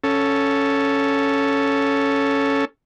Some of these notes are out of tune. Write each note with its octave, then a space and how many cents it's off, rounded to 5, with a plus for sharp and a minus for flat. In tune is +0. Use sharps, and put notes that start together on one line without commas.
C#4 +0 A4 +0